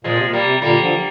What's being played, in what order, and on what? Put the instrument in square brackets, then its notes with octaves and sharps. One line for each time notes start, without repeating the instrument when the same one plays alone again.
[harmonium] A#2 [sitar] F3 G#3
[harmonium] C3
A#2
[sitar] G3 A#3
[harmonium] C3
[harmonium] A#2 D3 [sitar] G3 A#3
[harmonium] D3 F3